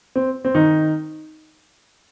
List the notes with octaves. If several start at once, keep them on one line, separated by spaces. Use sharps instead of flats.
C4
C4
D#3 D#4